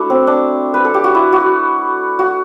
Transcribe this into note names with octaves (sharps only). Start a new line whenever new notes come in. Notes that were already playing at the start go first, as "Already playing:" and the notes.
Already playing: A3 D4 E4 F#4
C4
D4
B4
A4
G4
F#4
E4
F#4
F#4